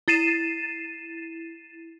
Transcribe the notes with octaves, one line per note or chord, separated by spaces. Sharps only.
E4 A6 C7 D#7 E7